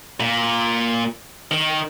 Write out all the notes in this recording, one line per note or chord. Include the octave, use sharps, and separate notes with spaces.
A#2
D#3